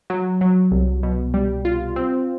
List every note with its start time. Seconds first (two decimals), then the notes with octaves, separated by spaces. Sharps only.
0.10 F#3
0.41 F#3
0.71 C2
1.03 B2
1.34 G3
1.65 F4
1.96 C4